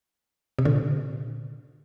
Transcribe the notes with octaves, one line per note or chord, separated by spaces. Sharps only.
C3
A#2 D3